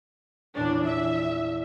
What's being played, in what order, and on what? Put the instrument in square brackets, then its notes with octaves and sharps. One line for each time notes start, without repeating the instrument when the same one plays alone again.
[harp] E2 A#2 C#4 [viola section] D4
[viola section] E5